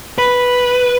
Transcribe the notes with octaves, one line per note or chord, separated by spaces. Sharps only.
B4